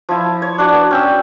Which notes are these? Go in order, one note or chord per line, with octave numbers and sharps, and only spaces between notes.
F3 E4
C#5
D4 F#4
B3
C#4 G5 E6